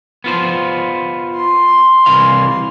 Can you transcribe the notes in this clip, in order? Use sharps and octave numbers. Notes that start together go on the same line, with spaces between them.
B3 F4 C5
C6
C2 E3 F5